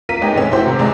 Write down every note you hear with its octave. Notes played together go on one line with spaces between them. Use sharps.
A#3 F4 A#4 B6 D#7
G#3 B3 C#4 D#4 G4 G#4
F1 C#4
A3 E4 F#4 G4 C5
G#2 C3
C2 G#3 D5 A#5